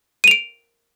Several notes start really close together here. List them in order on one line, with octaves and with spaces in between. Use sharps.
D#7 F7 D7